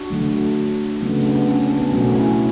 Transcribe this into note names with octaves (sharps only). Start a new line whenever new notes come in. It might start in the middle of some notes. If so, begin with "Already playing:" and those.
Already playing: D4 F#4
D3 F#3 A3
C#3 F#3 A3 B3 D4
B3 D4
C#4
B3
B3
B2 F#3 A3 C#4
C#4 E4